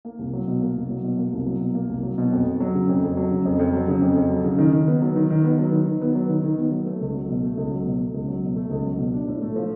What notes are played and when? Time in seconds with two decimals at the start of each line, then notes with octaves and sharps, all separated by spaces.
0.05 A#3
0.19 C2
0.33 F#3
0.48 B2
0.62 A#3
0.76 C2
0.90 F#3
1.04 B2
1.18 A#3
1.33 C2
1.46 F#3
1.61 B2
1.75 A#3
1.89 C2
2.03 F#3
2.18 B2
2.32 F2
2.47 F2
2.60 F#3
2.75 C#3
2.89 F2
3.03 F2
3.17 F#3
3.31 C#3
3.46 F2
3.59 F2
3.73 F#3
3.88 C#3
4.02 F2
4.16 F2
4.30 F#3
4.44 C#3
4.58 D#3
4.73 D#3
4.88 B3
5.02 F#3
5.16 D#3
5.30 D#3
5.44 B3
5.58 F#3
5.72 D#3
5.87 D#3
6.01 B3
6.15 F#3
6.29 D#3
6.44 D#3
6.58 B3
6.72 F#3
6.86 A3
7.01 C#2
7.15 F#3
7.29 B2
7.43 A3
7.57 C#2
7.71 F#3
7.85 B2
8.00 A3
8.14 C#2
8.28 F#3
8.43 B2
8.56 A3
8.71 C#2
8.85 F#3
8.99 B2
9.13 D4
9.28 A2
9.42 A3
9.56 F3